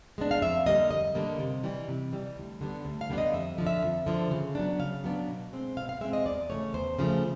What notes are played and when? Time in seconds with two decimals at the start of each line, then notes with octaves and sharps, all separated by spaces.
0.18 G#3 B3 D4
0.31 F5
0.42 F2 E5
0.66 D3 G3 A#3 D#5
0.90 F2 D#5
1.15 D3 G3 A#3
1.39 C3
1.64 E3 G3
1.88 C3
2.12 E3 G3
2.37 D2
2.61 D3 G3 B3 D4
2.85 D2
3.01 F5
3.10 D3 G3 B3 D4
3.18 D#5
3.34 F2 E5
3.58 D3 F3
3.67 E5
3.83 F2
4.06 D3 F3
4.31 C#3
4.55 F#3 B3 D4
4.79 C#3 F5
5.04 F#3 B3 D4
5.28 B2
5.53 G#3 C4
5.77 B2 F5
5.89 F5
6.01 G#3 C4 E5
6.13 D#5
6.26 E2 D5
6.50 C#3 F3 A3 C#5
6.74 E2 C5
6.99 C#3 F3 A3